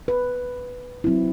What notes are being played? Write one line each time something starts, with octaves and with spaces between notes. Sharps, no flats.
B4
F#3 C4 E4